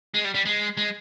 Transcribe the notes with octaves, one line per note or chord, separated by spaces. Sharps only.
G#3
G3
G3
G#3
G#3